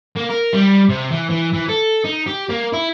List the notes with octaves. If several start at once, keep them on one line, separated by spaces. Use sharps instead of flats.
A#3
A#4
G3
C3
E3
E3
E3
A4
D#4
G4
A#3
E4